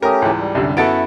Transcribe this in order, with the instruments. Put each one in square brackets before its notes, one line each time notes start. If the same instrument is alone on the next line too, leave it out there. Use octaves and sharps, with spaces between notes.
[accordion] A3 C#4 G4 [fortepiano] A#4 [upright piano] A#5 D#6
[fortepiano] C#2 E3 [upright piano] G#2
[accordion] G3
[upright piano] C2 F#2 D3
[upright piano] F#2 A6 D7 [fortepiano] B3 F#4 A4 [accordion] E4